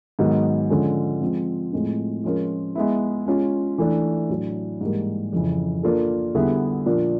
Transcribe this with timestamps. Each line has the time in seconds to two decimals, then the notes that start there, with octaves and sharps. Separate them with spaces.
0.19 G#2 D#3 F#3 B3 D#4
0.70 D3 F3 G#3 C#4
1.21 F3 G#3 C4
1.73 A2 F3 G#3 C4
2.24 F3 G#3 C#4 F4 A#4
2.75 G#3 B3 E4
3.27 G#3 C#4 F4
3.78 E3 A3 D4
4.29 A2 F#3 A3 D4
4.81 G#2 E3 G3 A#3
5.33 F2 C#3 E3
5.83 A#3 D4 F4 A4
6.35 D3 G3 B3 E4 G#4
6.86 A#2 F3 A#3 D4 F4